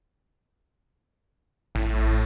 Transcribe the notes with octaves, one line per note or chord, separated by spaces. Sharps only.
A1 A2